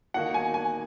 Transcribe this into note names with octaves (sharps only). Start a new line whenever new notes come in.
D#3 A#3 D#4 F#4 F#5
G#5
G#5